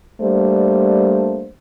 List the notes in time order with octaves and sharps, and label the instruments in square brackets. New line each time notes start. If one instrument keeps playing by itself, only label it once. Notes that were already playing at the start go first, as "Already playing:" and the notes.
[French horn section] G3 A3 A#3 D4 C5